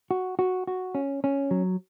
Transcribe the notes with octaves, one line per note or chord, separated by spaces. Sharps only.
F#4
F#4
F#4
C#4
C#4
F#3